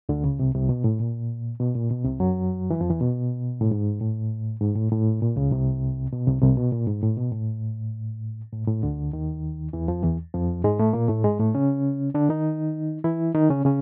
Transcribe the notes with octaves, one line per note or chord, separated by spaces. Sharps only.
D2 D3
C#2 C#3
C2 C3
C2 C3
B2
A2
A#2
B2
A#2
B2
C2 C3
F#2 F#3
E3
F2 F3
E2 E3
B2
A2
G#2
A2
G#2
A2
A2
A#2
C#2 C#3
C2 C3
B2
C2 C3
C2 C3
B2
A#2
G#2
A2
B2
A2
A2
A2
D2 D3
D#2 D#3
E2 E3
F2 F3
E2 E3
F2 F3
G#2 G#3
A2 A3
A#2 A#3
A2 A3
G#2 G#3
A2 A3
C#3 C#4
D3 D4
D#3 D#4
E3 E4
D#3 D#4
C#3 C#4
C#3 C#4